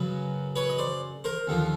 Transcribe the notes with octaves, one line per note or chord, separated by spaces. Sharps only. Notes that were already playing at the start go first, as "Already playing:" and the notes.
Already playing: F#2 C#3 F#3 B4
B4 C#5
D#5
C5 D5
A#4 C5
D#2 D3 F3